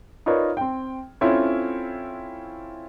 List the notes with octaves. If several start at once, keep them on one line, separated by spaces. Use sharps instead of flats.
D#4 F4 A#4 B4 C#5 D5
C4 G5
C4 C#4 E4 F4 A4 C#5